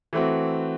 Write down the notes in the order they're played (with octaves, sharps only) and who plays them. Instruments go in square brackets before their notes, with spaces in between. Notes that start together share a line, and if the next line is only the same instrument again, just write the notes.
[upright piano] E3 A3 C4 F#4